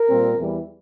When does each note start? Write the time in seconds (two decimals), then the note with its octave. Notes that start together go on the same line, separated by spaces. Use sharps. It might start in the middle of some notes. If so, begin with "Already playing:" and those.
Already playing: A#4
0.09 A#2 G3 C4
0.37 E2 E3 G3